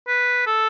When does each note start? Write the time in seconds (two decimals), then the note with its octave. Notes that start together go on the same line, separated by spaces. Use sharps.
0.08 B4
0.47 A4